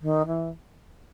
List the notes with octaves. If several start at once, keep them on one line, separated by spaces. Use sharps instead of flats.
D#3
E3